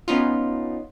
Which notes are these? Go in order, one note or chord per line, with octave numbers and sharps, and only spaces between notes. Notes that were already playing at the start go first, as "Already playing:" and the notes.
B3 C#4 D#4 F4